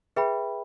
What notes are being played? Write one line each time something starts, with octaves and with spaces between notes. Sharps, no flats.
G#4 B4 E5 G5 B5